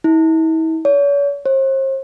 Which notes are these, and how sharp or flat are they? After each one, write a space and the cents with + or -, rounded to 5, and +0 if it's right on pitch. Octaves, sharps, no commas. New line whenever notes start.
E4 -40
C#5 +40
C5 +40